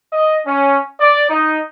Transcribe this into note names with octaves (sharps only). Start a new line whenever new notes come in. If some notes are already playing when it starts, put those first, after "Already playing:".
D#5
C#4
D5
D#4